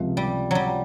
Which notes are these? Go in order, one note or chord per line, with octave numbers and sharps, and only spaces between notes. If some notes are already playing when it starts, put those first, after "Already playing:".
Already playing: C#2 C3 F3
G3
F#3 G3